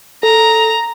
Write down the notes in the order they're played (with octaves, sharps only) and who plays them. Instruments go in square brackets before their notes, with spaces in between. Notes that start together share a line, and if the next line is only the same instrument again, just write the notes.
[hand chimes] A4 [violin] A#5